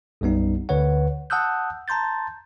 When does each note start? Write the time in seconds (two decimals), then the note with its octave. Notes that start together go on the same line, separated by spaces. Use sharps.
0.21 B1 F#2 G3 B3 D#4
0.69 D2 D3 B4 C#5 F#5
1.30 F#5 A5 D#6 E6 F#6 G6
1.88 A5 A#5 C6 G6 A6